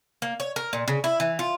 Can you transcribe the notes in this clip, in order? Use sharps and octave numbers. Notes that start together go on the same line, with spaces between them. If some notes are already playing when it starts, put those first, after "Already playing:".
A#3
C#5
A#4
A#2
C#3
E4
E3
F4